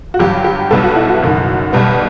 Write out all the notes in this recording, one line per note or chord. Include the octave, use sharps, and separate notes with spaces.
F#4
G1 G2 F#3 G4
G4
B1 B2 G3 B3 A4
F#4
E4
F#4
F#1 F#2 D#3
B1 B2 G3 B3